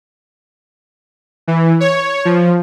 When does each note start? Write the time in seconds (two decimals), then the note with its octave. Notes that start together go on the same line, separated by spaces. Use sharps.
1.47 E3
1.80 C#5
2.25 F3